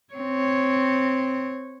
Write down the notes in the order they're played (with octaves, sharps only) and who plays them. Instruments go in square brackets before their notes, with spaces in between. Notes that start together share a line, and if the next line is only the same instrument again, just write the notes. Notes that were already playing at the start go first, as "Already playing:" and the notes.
[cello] C4 C#5